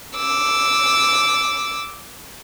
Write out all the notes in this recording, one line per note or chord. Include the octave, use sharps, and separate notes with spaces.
D6 E6